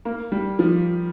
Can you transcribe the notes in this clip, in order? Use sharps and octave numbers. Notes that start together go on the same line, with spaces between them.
A#3
G3
F3